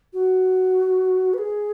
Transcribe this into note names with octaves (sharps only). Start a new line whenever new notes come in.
F#4
B4
G#4